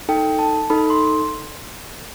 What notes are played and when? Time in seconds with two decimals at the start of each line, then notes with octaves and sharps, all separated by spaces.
0.09 D#4 A4 G5
0.39 A5
0.70 D#4 A4 B5
0.90 C6